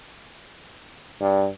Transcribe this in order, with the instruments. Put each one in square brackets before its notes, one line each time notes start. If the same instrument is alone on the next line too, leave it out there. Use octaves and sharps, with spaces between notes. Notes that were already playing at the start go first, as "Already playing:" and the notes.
[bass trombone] G2